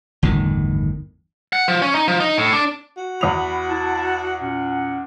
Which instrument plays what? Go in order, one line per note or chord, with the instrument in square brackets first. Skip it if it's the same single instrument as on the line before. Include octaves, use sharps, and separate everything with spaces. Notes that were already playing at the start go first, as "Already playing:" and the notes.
[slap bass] G1 E2 A2 D#3
[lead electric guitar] F#5
F3
C#4
D#4
F3
D#4
A2
D4
[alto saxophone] F#4
[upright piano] E2 D#6 F7 [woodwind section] B5
[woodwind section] E4 A5
A#2 C#4 F#5